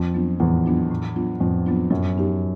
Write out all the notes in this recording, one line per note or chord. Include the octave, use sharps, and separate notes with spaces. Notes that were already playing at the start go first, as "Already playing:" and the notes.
Already playing: F2
F#3 B3 D4 F4
E2 A2
F#3 B3 D4 F4
A2
F#3 B3 D4 F4
F2 A2
F#3 B3 D4 F4
F#2 F#3
B3 D#4 G4